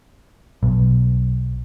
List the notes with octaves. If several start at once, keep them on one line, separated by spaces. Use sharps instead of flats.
B1